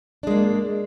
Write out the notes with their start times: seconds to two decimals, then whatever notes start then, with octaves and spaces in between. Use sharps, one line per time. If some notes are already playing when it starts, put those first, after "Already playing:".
0.23 D4
0.27 G#3
0.31 A#3